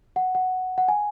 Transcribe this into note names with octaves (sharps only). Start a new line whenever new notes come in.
F#5
F#5
F#5
G#5